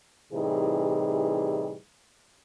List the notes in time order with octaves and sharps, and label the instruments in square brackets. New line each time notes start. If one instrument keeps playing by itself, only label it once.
[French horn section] A2 C3 E3 G3 D#4 G#4